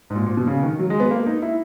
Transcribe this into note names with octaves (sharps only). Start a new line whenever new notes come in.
G#2
A#2
A#2
B2
C#3
D#3
F#3
G#3
B3
A#3
D#4
E4